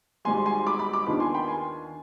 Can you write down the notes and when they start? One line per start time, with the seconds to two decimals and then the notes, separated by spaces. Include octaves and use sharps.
0.25 G#1 G#2 G3 G#5 C6
0.46 G#5 C6
0.67 B5 D6
0.79 B5 D6
0.93 B5 D6
1.06 D#2 D#3 B3 D4 F4 B5 D6
1.20 G#5 C6
1.34 G5 B5
1.47 G#5 C6